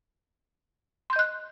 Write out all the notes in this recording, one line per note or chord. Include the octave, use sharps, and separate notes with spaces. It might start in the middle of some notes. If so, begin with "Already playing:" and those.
D#5 C6 F#6 G6